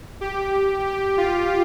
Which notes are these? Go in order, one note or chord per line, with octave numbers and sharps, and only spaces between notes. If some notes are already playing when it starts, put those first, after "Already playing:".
G4
G4
F4